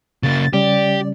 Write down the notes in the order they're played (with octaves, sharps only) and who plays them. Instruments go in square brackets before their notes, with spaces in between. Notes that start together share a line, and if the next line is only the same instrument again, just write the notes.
[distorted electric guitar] C#3 A#3 [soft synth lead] A6
[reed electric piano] C#3 G3 C#4 [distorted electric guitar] G4 [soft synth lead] D5